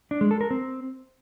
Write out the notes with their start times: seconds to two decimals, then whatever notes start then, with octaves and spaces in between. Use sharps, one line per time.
0.11 D4
0.21 G#3
0.31 A4
0.41 A#4
0.51 C4